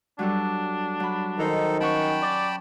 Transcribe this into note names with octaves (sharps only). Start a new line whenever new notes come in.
F#3 G3 D4 A4
F#3 B5
D#3 D#4 A4 C5 A#5
C#4 F#5 G5 A5 B5 C#6
D5